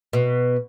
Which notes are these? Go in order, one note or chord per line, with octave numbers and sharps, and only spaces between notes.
B2